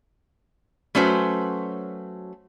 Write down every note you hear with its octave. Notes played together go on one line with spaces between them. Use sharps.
F#3 A3 C#4 F#4 B4 C5